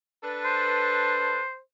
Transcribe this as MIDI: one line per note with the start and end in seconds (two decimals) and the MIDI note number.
0.23 1.40 62
0.23 1.40 69
0.23 1.40 71
0.45 1.59 72